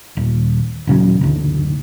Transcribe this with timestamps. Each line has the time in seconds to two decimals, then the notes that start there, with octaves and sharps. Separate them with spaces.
0.17 D#1
0.87 D#1 C#3 F#3
1.21 F#1 D2